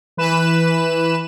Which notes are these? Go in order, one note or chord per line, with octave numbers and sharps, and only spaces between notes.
E3 B4 E7